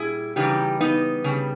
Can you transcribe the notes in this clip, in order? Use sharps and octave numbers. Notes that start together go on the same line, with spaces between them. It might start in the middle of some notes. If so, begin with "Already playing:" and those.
Already playing: A#2 G3 E4 G#4
C#3 E3 G3 D#4 G4
B3 D#4
C#3 G3